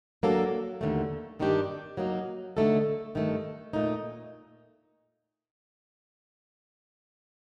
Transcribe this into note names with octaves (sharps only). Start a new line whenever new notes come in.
F#3 A#3 D4 A4
D#2 D3 A3
G2 D#3 G3 D4 G4
F#3 A#3 D#4
D3 A3 D#4 A4
G2 D#3 A3
A#2 A3 D#4